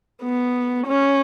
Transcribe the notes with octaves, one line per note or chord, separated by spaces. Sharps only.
B3
C#4